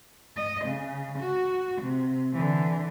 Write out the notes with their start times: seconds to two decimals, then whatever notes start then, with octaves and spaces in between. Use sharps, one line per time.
0.36 D#5
0.66 C#3
1.19 F#4
1.82 C3
2.33 D3 E3